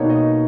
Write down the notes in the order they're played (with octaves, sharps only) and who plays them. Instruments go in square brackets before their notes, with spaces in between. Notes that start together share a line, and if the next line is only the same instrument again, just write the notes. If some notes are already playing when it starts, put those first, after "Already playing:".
Already playing: [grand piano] B2 A#3 D#4 C#5
D#5